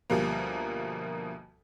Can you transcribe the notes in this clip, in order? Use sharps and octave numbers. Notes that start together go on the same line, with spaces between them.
D2 B2 F3 G3 A#3